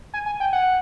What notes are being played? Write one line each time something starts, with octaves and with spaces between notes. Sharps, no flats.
G#5
G#5
G5
F#5